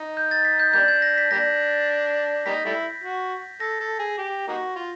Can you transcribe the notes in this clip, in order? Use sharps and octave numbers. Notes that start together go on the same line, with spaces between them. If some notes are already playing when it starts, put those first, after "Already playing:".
Already playing: D#4
G6
A6
B6
G6
G3 A#3 D4 G6
G#6
A#6
B6
G3 A#3 D4 A#6
G3 A#3 D#4 B6
G3 A3 E4
F#4
A4 A#6
A4
G#4
G4
A#3 D#4 F#4
F4